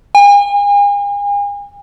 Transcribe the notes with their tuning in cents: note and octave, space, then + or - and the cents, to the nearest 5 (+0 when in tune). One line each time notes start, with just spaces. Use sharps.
G#5 -40